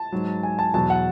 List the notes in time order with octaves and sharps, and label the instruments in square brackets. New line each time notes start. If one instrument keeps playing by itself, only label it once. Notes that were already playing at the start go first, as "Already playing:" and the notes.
Already playing: [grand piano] A5
G#2 F#3
G#5
A5
E2 B2 F#3 A5
F#5